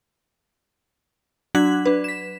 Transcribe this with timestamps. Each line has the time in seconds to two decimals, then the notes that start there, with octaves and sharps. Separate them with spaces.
1.55 F#3 D4 F#6 G#6 B6 F#7
1.86 D4 B4
2.04 B6 E7